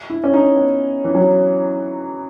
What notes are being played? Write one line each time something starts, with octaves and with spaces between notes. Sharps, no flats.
E4
C#4
D#4
B3
E3
F#3